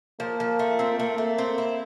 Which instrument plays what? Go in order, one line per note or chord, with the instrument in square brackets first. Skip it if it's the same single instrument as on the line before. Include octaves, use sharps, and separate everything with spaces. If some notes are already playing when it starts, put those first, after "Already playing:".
[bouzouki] F3 [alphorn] A#3
[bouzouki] F3
A3
C4
[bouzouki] A3 [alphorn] A#3
[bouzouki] A3
C4
E4